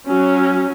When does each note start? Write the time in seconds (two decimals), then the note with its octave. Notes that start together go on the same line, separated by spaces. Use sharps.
0.08 F#3 C#4